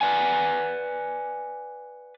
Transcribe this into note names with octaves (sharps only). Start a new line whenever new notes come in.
B4 D5 F#5 G#5